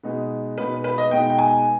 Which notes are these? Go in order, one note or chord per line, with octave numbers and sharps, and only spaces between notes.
B2 G#3 B3 D#4
B2 G#3 B3 D#4 B4
B4
D#5
B2 G#3 B3 D#4 G5
G5
G#5